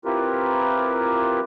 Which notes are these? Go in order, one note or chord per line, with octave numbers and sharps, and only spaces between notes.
C4 E4 F4 G4 A#4 B4